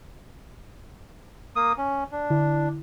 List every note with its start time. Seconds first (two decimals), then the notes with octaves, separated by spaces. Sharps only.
1.56 A#3 D#6
1.78 C#4
2.12 D4
2.30 D3 E4